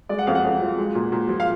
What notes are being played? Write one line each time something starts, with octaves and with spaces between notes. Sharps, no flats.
G#3 D5
F#5
F2 F5
F#5
F2
F3
G#3
A#2
A#2
F3
F5